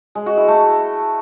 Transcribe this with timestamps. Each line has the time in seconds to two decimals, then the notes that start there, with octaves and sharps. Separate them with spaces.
0.15 G#3
0.26 F#4
0.37 E4
0.48 A3